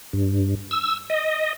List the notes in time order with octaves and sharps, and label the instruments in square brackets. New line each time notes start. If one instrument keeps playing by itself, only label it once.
[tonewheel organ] G2
E6
D#5